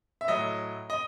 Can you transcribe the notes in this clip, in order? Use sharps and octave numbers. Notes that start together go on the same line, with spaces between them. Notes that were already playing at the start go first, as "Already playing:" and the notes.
E5
A2 F#3 D#5
D#5